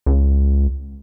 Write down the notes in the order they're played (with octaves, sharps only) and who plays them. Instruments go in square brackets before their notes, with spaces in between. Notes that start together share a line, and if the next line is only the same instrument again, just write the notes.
[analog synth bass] C#2